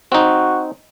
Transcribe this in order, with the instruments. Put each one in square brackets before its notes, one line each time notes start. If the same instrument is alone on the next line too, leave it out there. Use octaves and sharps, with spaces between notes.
[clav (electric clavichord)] C4 D#4 [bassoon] F#4